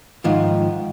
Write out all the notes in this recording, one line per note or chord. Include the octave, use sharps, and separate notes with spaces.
G#2 D#3 F3